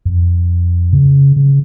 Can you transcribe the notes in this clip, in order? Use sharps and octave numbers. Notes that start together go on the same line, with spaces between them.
F2
C#3
C#3